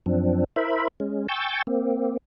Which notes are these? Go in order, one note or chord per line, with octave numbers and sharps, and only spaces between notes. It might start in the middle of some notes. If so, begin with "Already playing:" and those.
F#2 F3 C4 D4
E4 A#4 C5 E5 B5
G#3 C#4
G5 G#5 C#6 E6 G6 A6
A#3 C4